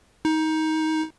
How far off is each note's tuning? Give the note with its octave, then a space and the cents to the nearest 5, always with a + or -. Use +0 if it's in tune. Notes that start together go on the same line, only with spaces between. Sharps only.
D#4 +20